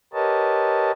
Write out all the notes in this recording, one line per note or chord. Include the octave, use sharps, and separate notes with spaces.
G4 A#4 B4 C#5 D#5 A5